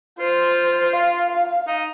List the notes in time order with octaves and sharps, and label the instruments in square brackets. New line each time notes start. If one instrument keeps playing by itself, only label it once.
[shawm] F4 [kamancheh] C5
[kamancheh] F5
[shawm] D#4